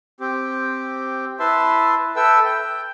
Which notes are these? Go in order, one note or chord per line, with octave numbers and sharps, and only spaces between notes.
C4 G4
E4 B4 E5 A5 C6
A4 B4 E5 G5 E6
G5